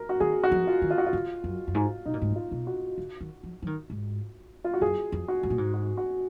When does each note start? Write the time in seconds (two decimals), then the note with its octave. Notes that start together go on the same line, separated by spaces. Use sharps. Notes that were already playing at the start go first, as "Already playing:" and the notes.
Already playing: A#4
0.09 F#4
0.20 D#3 G#4
0.43 F#4
0.52 F3
0.67 F4
0.82 D#3
0.90 F4
0.98 F#4
1.06 F4
1.13 D3
1.44 F#2
1.67 F#2
1.75 G#2
2.05 B2 D#4
2.13 A#2
2.22 G#2
2.30 A#2
2.36 F4
2.51 B2
2.67 F#4
2.98 D3
3.21 D#3
3.43 F3
3.62 F3
3.67 D#3
3.90 G#2
4.64 F4
4.74 F#4
4.81 F#2 G#4
5.12 F2
5.28 F#4
5.43 G#2
5.50 A#2
5.58 G#2
5.74 F#4
5.97 F#4